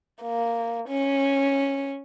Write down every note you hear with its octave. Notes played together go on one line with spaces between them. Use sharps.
A#3
C#4